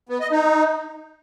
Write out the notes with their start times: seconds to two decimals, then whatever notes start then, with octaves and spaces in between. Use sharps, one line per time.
0.09 B3
0.20 D#5
0.31 D#4